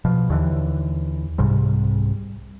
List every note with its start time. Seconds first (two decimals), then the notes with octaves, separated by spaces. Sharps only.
0.05 B2 F3
0.30 D#2 D3 E3
1.38 C2 G#2 C3 G3